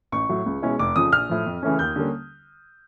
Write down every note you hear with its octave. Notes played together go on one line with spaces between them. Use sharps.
A1 C#6
A2 F#3
C#2
B2 G#3 C#4 E4
F1 D6
F2 C#3 F3 D#6
A#1 F6
A2 F3
F2
C#3 E3 A3 C#4
D#2 G6
D3 G3 A#3 C#4